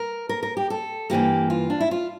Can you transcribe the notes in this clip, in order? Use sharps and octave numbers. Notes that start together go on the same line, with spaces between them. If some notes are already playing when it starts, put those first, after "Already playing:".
Already playing: A#4
A#4
A#4
G4
A4
G2 E3 A#3 G4
F4
D4
E4
F4